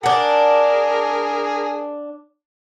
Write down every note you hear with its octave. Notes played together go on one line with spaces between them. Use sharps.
D4 G#4 A#4 F#5